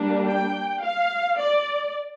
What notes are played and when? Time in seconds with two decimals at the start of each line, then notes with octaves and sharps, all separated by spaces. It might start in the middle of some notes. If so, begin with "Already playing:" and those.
Already playing: G3 A#3 D4
0.26 G5
0.81 F5
1.39 D5